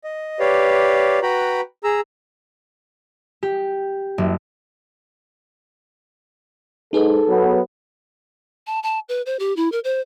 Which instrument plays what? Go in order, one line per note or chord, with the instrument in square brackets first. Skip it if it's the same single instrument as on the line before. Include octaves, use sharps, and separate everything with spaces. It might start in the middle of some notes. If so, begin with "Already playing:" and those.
[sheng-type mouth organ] D#5
G4 B4 C#5 D5 F5
F#4 B4 G5 A#5 B5
G#4 A#5 E6
[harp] G4
F#1
[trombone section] G#2 [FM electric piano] D#4 G#4 B4 [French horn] A4
[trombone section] F#3 B3
[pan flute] A5
A5
B4
C5
G4
E4
A#4
C5